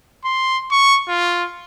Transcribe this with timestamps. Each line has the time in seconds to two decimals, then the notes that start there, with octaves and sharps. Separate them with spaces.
0.24 C6
0.71 C#6
1.08 F4